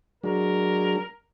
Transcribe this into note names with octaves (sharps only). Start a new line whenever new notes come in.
F#3 G#3 D4 A#4